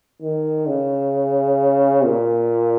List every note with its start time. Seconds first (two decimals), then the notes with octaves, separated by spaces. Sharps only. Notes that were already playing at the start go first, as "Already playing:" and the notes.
0.22 D#3
0.68 C#3
2.05 A#2